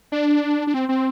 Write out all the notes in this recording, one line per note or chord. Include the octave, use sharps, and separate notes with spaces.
D4
D4
C4
C4